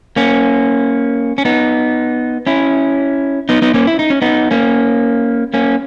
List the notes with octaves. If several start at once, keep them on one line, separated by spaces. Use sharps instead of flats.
A#3 C#4
C#4
B3 D#4
C#4 E4
B3 D#4
B3 D#4
A#3 C#4
E4
D#4
C#4
B3 D#4
A#3 C#4
A#3 C#4